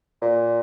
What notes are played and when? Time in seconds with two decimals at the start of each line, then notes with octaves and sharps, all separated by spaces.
0.22 A#2